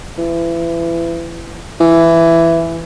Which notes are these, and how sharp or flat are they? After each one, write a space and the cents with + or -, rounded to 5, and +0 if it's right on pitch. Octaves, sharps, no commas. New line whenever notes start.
E3 +30
E3 +10